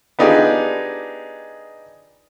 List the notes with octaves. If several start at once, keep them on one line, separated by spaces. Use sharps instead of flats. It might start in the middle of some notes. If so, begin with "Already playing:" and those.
B3 D4 D#4 F4 G4 G#4